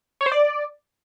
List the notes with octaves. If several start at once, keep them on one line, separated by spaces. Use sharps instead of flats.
C#5
C5
D5